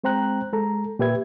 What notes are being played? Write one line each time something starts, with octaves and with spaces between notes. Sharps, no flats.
G#3 C4 C5 G5 A#5 F#6
G#3 A4 A#5
A#2 G4 B4 E5 G#6